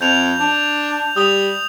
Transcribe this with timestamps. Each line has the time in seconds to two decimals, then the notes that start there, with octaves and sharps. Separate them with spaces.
0.01 F2 G6 F7
0.40 D4
1.16 G3 D#6 F7